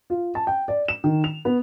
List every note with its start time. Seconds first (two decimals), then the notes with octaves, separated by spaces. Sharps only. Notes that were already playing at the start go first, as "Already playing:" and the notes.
0.10 F4
0.35 A5
0.47 G5
0.68 D5
0.88 E7
1.04 D#3
1.24 F7
1.45 B3